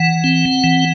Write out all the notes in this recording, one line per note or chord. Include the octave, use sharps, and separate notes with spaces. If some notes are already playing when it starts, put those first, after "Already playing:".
Already playing: E3 F#5
C4
E3